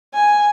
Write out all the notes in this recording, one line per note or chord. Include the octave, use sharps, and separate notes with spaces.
G#5